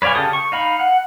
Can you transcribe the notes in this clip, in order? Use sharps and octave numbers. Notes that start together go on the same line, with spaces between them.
B4 C#5 D5 F5 G#5
C#3 F4 G4 A4 D#6
C#6
D#4 F5 B5
F#5